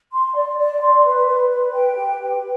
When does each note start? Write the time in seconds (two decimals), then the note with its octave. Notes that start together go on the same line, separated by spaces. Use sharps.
0.12 C6
0.35 D5
0.58 D5
0.80 C6
1.04 B4
1.27 B4
1.50 B4
1.72 G5
1.95 G4
2.20 B4